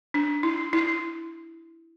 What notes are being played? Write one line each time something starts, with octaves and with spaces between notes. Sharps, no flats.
D4
E4
E4